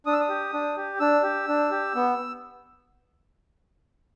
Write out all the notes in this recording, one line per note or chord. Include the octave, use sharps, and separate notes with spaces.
D4 D#6
E6
D#6
G4
D4
G4
D4 E6
G4
D4
G4
B3